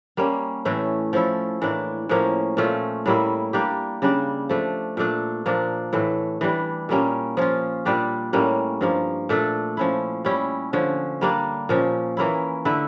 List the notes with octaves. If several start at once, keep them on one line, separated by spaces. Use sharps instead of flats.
G3 A#3 C#4
A2 E3 A3 C#4
F3 C#4 E4 A4
A2 E3 A#3 D4
A2 F3 A#3 C#4
A#2 A3 C#4 F4
A2 G3 A#3 E4
G3 A#3 D4 G4
C#3 G3 D4
F3 A3 D4
A#2 A3 D4
A#2 F3 A#3 D4
A2 E3 A3
E3 G3 D4
A#2 G3 A#3 C#4
F3 C#4 F4
A#2 G3 D4 G4
A2 G3 A#3 C#4
G2 F3 A#3
A#2 A3 D4 A4
F3 C#4 E4
G3 C#4 E4
D3 F3 C#4
G3 A#3 D4
A#2 F3 C#4
E3 A#3 C#4 E4
D3 A3 E4